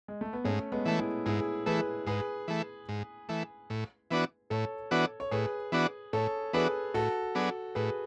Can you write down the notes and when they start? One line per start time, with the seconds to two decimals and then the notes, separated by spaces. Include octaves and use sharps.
0.08 G#3
0.21 A3
0.33 B3
0.44 G#2 A3 C#4
0.72 G#3 B3
0.85 E3 A3
0.99 E4 G#4
1.26 G#2 E4 G#4
1.66 E3 A3 G#4 B4
2.07 G#2 G#4 B4
2.48 E3 A3
2.89 G#2
3.29 E3 A3
3.70 A2
4.11 E3 B3 D4 F#4
4.50 A2 A4 C#5
4.91 E3 B3 D4 F#4
5.20 C#5
5.31 A2 G#4 B4
5.72 E3 B3 D4 F#4
6.13 A2 A4 C#5
6.53 E3 B3 D4 F#4 G#4 B4
6.94 A2 F#4 A4
7.35 F#3 B3 D4 G#4
7.75 A2 G#4 B4